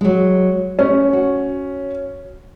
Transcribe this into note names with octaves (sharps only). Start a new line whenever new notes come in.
F#3 G#3
A3 C#4
F#4